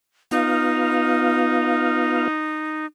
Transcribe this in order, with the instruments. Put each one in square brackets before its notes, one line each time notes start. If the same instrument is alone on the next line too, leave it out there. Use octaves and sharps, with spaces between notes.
[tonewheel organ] B3 F4 F5 [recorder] D#4